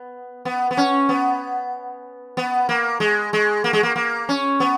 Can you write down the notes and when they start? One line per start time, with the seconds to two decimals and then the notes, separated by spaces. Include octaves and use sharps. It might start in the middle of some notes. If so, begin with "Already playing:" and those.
Already playing: B3
0.45 B3
0.71 B3
0.77 C#4
1.09 B3
2.37 B3
2.69 A#3
3.00 G#3
3.33 G#3
3.64 A#3
3.73 G#3
3.83 A#3
3.96 A#3
4.29 C#4
4.60 B3